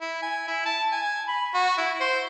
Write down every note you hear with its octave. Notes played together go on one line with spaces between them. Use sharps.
E4
G#5
E4
A5
G#5
B5
F#4
E4
C5